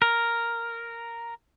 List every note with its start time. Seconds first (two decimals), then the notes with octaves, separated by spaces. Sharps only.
0.02 A#4